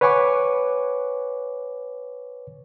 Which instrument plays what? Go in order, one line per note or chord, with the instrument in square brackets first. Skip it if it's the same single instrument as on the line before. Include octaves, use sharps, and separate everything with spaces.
[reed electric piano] B4 C#5 F#5 G#5 C#6 D6